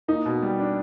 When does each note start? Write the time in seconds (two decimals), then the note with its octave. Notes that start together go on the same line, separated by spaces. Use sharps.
0.08 A#3 D#4
0.25 B2
0.42 G3
0.59 D4